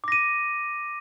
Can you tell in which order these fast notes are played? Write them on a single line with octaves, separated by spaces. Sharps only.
D6 A#6 D#7